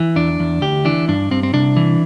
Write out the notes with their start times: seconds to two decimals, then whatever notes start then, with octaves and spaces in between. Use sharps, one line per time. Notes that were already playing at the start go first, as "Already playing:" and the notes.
Already playing: E3
0.16 E2 D4
0.40 E2
0.61 D2 G4
0.85 E3 D4
1.08 G2 D4
1.31 G2 C4
1.43 C4
1.53 C2 D4
1.76 E3